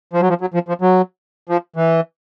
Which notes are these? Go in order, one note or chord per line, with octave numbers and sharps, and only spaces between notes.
F3
F#3
F3
F#3
F3
F3
F#3
F3
E3